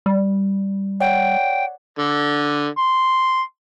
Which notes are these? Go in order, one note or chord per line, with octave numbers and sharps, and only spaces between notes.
G3
C#5 D5 F#5 G5
D3
C6